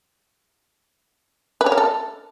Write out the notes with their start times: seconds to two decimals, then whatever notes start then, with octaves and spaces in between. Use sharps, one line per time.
1.61 B4
1.66 C#5
1.72 A#4
1.78 A4